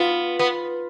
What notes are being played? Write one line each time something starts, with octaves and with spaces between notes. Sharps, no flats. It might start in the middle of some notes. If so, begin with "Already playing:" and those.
Already playing: B3 F4
B3